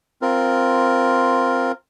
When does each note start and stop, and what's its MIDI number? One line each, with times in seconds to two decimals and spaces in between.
0.22 1.72 60
0.22 1.72 65
0.22 1.72 70